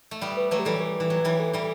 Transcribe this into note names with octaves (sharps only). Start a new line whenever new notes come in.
A3
G3 B3
B4
F#3 A3 B4
G4
E3 G3 A4
B4
E3
F#3
E3 G3
A4
E3 G3